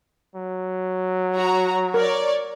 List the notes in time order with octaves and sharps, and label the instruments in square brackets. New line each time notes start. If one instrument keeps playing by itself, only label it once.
[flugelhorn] F#3
[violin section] F#4 A#5
[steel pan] A#4 [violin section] C#5 D5